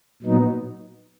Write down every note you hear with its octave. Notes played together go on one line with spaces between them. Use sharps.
A#2 F#3 B3 D#4